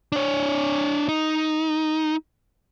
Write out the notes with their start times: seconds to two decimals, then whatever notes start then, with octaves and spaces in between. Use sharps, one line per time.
0.12 D4 C#5
1.08 D#4